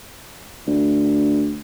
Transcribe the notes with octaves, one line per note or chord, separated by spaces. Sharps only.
D2